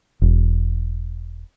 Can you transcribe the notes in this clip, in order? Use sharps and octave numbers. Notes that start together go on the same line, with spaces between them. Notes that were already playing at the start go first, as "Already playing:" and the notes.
E1